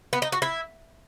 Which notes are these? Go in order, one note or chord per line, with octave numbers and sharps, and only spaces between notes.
B3
D#4
F#4
E4